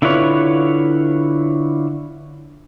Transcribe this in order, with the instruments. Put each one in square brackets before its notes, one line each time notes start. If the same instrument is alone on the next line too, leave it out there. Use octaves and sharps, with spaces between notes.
[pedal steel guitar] D3 E4 F4 B4 C#5